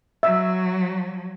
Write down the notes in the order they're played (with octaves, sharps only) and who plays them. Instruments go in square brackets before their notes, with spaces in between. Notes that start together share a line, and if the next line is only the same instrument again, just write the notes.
[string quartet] F#3 [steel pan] E5